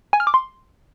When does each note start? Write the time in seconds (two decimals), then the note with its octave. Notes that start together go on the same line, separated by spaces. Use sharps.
0.13 G#5
0.20 F6
0.27 D6
0.34 C6